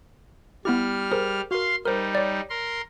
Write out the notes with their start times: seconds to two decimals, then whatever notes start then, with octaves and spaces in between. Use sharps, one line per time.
0.65 G3 B3 E4 G4 F6
1.12 G#4 A#4 C5
1.51 F#4 A#4 F5 C6
1.85 G3 D#4 A#4 C5
2.15 C#5 D5
2.49 A#4 C6